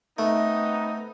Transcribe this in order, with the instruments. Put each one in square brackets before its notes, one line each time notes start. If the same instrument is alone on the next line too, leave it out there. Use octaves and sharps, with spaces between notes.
[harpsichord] A3 [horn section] B3 C4 D#4